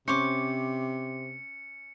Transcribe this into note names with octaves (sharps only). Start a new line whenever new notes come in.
C3 C#4 C5 C#6 D6 C#7